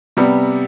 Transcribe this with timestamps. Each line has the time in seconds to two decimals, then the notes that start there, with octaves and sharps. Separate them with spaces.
0.17 C3 G3 B3